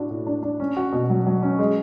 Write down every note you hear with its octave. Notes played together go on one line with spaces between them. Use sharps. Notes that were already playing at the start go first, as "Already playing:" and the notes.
Already playing: A2 D4 F#4
A2
D4
D4
C#4
F#4
B2
F#3
F#3
C#4
G#3